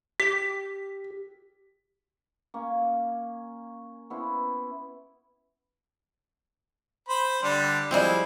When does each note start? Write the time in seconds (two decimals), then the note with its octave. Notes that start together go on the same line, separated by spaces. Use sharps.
0.20 G4 B6
2.54 A#3 C#4
4.10 B3 C#4 E4 C5
7.09 C5 B5
7.42 D3 G3 D4
7.91 F3 G3 G#3 C4 E4